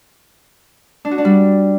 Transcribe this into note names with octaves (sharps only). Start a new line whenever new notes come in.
D4
F#4
D4
G3